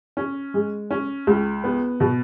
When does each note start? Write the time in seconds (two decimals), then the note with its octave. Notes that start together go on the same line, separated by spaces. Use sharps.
0.17 C#4
0.54 G#3
0.91 C#4
1.27 C#2
1.64 B3
2.00 B2